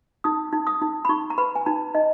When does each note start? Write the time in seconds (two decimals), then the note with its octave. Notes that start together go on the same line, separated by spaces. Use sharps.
0.24 D#4 D#6
0.53 D#4
0.67 D#6
0.82 D#4
1.05 B5
1.09 D#4 C#6
1.30 A#5
1.38 B4 B5
1.55 G#5
1.66 D#4 A#5
1.95 D#4 D#5